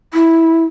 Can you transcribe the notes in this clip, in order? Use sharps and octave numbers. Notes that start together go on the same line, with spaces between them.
E4